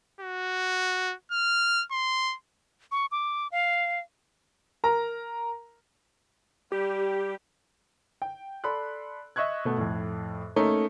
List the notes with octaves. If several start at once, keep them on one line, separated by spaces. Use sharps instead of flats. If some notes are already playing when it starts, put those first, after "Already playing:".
F#4
F6
C6
C#6
D6
F5
A#4 A#5
G3 G4
G5
A4 D5 B5 C6 F#6
D#5 E5 C#6 F#6 G#6
B2 A3 B3
F2 A2
A3 A#3 C#4 D#4